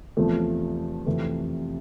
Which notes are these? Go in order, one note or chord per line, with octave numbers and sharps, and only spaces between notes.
E2 C3 F3 A3
F2 C3 E3 A3